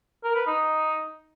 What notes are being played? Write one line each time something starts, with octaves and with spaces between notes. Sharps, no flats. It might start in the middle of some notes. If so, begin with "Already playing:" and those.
A#4
B4
D#4